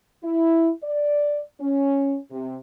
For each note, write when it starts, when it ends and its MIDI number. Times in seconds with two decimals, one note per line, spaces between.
0.23 0.70 64
0.83 1.40 74
1.61 2.16 61
2.31 2.57 48